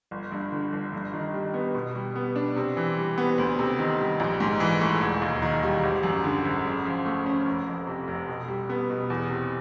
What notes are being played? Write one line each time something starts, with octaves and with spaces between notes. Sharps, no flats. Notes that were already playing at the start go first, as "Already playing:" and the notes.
G1
G2
D3
G1
G2
D#3
G3
B3
B2
G3
B3
D4
C3
E3
G3
B3
D2
C3
D#3
G3
A#1
G#2
E3
A3
E1
D#2
D#3
G3
G#1
F#2
D3
G#1
C#3
F3
A3
C#4
F1
F2
C3
F1
B2
G3
B3
B2
E2
C3